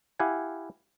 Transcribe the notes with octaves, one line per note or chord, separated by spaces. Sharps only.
E4 G4 F5 F#5 G#5